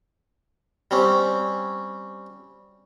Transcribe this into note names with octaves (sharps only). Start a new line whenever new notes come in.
G3 C4 C#4